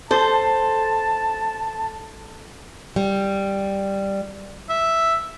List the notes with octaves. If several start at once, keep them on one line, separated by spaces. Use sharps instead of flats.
A4 C5 A5
G3
E5